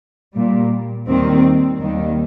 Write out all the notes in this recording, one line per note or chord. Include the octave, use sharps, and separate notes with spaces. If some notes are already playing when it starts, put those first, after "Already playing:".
A#2 G3
D#2 D#3 G3 C4
D#2 D#3 G3